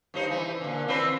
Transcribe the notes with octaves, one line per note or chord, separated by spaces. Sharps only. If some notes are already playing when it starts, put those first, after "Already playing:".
G2 D#4 C5
E3
A#2 D3
E3 C4 B4